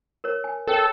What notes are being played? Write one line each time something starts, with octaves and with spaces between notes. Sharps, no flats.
A#4 C#5
G#5
A4 A#4 C#5 G5